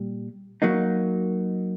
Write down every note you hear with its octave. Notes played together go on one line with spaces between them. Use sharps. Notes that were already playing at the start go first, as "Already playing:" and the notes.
Already playing: A#2 G3
F#3 A#3 D#4